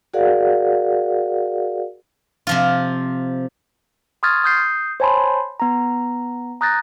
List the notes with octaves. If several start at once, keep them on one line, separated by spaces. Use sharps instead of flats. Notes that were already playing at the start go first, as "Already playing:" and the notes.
F#4 G#4 A#4 D5 F5 F#5
C3 F3 F4
C6 C#6 D#6 F6 G#6 A6
D#6 G6 C7
C5 C#5 G#5 A5 B5 C6
B3 A#5
A#5 D#6 F#6 G6 A6 A#6